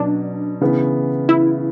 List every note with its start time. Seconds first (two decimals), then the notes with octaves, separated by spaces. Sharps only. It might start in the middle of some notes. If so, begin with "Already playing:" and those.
Already playing: B2 F#3 C#4 D4
0.61 C#3 E3 B3
1.29 E4